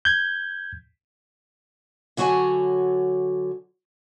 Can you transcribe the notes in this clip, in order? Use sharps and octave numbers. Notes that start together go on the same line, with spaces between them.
G6 G#6
D3 F#3 F#4 C#5 G#5